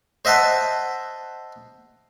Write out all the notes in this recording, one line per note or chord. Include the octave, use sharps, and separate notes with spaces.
C5 D#5 E5 F#5 A5